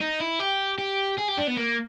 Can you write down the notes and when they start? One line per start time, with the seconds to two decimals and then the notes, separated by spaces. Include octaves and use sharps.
0.01 D#4
0.20 E4
0.40 G4
0.78 G4
1.18 G#4
1.28 G4
1.37 D4
1.47 B3
1.57 A#3